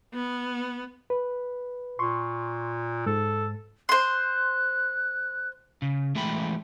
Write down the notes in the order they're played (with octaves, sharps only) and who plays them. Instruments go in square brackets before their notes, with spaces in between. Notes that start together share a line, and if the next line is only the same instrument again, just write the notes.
[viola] B3
[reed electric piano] B4
[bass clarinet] A#2 [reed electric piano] C6 C#6
[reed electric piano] G#2 [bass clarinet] A4
[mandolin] C5 C6 [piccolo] F#6
[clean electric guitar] C#3
E3 G#3 A3 E5 G5 B5